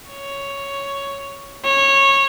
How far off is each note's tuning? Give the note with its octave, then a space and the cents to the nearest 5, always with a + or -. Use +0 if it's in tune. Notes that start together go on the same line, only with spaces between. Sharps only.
C#5 +5
C#5 -15